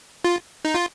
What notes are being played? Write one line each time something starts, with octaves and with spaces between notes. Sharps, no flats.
F4
D#4
F4